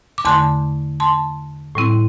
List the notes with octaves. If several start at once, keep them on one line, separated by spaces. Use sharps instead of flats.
D6
E2 D3 A3 A5 C6
A5 C6
A2 G3 C4 E4